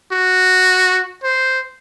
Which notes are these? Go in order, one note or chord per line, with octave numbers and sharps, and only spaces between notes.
F#4
C5